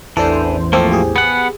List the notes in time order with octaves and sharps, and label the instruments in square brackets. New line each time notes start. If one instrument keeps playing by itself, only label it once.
[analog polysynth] A1 E2 C5 [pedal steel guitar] E3 [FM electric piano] D4 A4
[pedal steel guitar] F3 A3 A#3 [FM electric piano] C4 A4
[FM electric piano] G4 G#4
[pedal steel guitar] B3 F#5